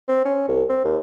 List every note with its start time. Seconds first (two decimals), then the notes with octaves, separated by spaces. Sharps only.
0.08 C4
0.25 C#4
0.48 C2
0.69 C4
0.84 D#2